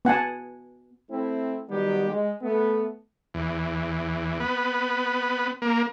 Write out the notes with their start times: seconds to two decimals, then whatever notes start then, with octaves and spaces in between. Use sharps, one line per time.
0.05 B3 F#5 G#5 A5
1.10 A3 C4 E4
1.69 D#3 F#3 G3 B3 G4
2.09 G#3
2.42 A3 B3
3.34 E2
4.40 B3
5.62 A#3